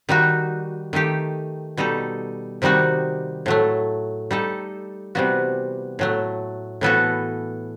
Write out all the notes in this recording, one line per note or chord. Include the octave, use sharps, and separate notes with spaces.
D#3 G3 D#4 F#4
D#3 A3 D#4 G4
B2 G3 D#4 A4
C3 D#3 G3 D#4 F#4
A2 F#3 A3
G3 D#4 A4
C3 E3 G3 B3 F#4
A2 F#3 A3
A2 E3 B3 F#4 A4